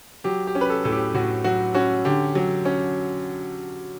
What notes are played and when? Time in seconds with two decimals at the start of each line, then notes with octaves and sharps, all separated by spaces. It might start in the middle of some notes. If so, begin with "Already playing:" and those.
0.24 F#3 G4
0.47 G4
0.55 C#4
0.61 B4
0.69 A4
0.84 A2 A4
0.92 G4
1.14 A2 F#4
1.44 F#3 F#4
1.74 C#4 F#4
2.05 D3 G4
2.35 F#3
2.65 C#4